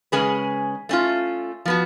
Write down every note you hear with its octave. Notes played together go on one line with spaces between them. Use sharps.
C#3 G#3 C#4 G#4 B4
A3 C#4 F4
F3 B3 F#4